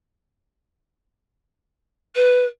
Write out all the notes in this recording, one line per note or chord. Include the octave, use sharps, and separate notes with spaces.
B4